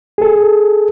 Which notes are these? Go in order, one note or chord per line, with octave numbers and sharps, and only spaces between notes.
G#4 A4